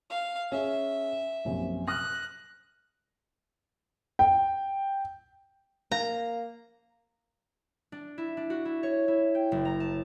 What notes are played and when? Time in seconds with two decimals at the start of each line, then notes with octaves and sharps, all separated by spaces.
0.10 F5
0.52 C#4 G#4 E5
1.45 A#1 F#2 C3
1.88 D#6 F6 F#6 A#6
4.19 G5
5.92 A#3 A#5
7.92 D4
8.18 E4
8.37 D4
8.50 F#4
8.65 E4
8.83 C#5
9.08 E4
9.35 G5
9.52 F#1
9.65 A#5
9.80 A5